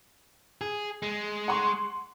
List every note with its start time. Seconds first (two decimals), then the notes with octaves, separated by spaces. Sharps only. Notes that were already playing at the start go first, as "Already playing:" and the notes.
0.61 G#4
1.03 G#3
1.48 F#5 C6 C#6